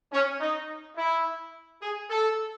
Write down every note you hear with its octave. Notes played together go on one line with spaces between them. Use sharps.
C#4
D#4
E4
G#4
A4